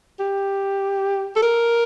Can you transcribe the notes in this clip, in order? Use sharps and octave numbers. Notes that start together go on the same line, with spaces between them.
G4
A4
A#4